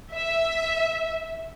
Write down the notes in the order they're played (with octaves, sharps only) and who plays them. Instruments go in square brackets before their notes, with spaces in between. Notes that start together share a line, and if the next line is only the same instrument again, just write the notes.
[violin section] E5